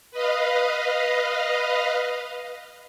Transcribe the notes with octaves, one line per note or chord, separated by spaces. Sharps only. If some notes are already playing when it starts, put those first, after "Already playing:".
B4 D#5 F5